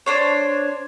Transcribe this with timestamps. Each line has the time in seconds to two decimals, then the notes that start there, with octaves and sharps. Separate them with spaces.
0.06 D4 C5 C#5